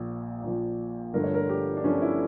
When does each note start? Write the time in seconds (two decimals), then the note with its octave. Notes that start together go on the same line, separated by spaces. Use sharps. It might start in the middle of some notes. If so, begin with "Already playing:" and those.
Already playing: A#1 A#2 F3
0.43 A#1 A#2 F3
1.13 G1 G2 D3 F3 A3 A#4
1.24 C#5
1.34 A#4
1.49 G4
1.77 D4
1.84 G1 G2 D3 F3 A3 C#4
2.02 E4